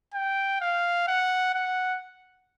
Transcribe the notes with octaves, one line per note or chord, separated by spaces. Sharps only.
G5
F5
F#5
F#5